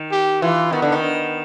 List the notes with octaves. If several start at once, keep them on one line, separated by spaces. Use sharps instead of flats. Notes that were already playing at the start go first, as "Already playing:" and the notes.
Already playing: D#3
G4
E3 F4
D#3 B3
D3
D#3
B3